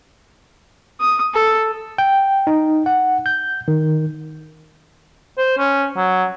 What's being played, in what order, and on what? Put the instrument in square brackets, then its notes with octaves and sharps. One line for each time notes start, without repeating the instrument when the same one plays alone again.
[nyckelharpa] D#6
A4
[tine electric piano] G5
D#4
F#5
G6
D#3
[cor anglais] C5
C#4
F#3